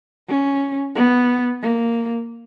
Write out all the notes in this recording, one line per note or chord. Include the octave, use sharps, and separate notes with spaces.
C#4
B3
A#3